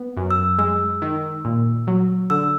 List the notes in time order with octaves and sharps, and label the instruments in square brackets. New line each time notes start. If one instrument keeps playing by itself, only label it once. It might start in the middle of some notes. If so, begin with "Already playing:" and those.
Already playing: [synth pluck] B3
F#2
[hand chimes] E6
[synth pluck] G#3 [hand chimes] E6
[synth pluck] D#3
A#2
F#3
[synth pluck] D3 [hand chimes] E6